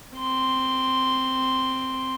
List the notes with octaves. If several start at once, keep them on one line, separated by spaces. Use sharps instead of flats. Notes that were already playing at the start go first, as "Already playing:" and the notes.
C4 C6